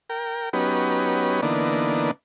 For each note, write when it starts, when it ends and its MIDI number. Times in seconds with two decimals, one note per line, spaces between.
0.09 0.49 70
0.09 0.49 79
0.53 1.41 54
0.53 1.41 59
0.53 1.41 61
0.53 1.41 63
0.53 1.41 67
0.53 1.41 71
1.42 2.11 50
1.42 2.11 52
1.42 2.11 58
1.42 2.11 59
1.42 2.11 62
1.42 2.11 63